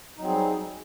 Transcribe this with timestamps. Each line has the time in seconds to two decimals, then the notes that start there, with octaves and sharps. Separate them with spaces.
0.17 D#4
0.20 F#3
0.23 C4
0.26 G#4
0.29 G3